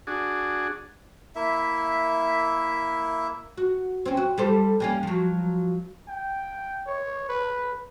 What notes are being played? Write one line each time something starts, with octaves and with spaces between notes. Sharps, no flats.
D4 F#4 G#4
A#3 E4 E5
F#4
C4 C#4
F#4
G3 A4 C5
G3 A#3 C#4
F3 F#3
G5
C#5
B4